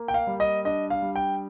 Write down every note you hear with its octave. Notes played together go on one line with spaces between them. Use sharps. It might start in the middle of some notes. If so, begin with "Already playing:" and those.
Already playing: A#3
G5
F5
G3
D#5
D4 D#5
F5
G3
G5